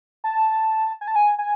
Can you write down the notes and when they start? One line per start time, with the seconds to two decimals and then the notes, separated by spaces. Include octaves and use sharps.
0.24 A5
1.01 G#5
1.08 A5
1.16 G#5
1.38 G#5